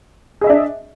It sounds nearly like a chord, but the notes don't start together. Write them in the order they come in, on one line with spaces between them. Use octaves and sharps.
G#4 D#5 E5 D4